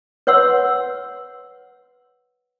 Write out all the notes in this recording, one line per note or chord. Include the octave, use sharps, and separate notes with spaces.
B4 C#5 F#5 C6 E6